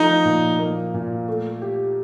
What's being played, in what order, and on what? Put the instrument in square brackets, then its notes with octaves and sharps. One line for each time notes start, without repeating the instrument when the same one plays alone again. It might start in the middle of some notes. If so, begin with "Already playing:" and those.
Already playing: [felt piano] F3 A3 [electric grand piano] D#4
[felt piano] A#2
A#3
A#2
A3
G4